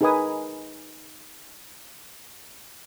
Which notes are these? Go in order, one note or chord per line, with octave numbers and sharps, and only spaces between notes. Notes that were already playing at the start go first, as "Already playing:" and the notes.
D#4 G#4 A#4 B4 G#5 D#6